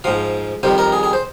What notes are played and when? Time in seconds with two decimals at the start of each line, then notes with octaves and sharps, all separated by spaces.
0.04 G#2 F3 F5
0.63 F2 D#3 G3 C5
0.78 A#4
0.92 G#4
1.03 G#4
1.13 C5